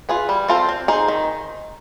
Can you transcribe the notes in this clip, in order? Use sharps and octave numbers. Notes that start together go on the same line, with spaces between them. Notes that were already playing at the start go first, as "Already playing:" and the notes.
F4 G#4 B4
G3
C4 F4 A4 C5
C4
D#4 G#4 C5
D#3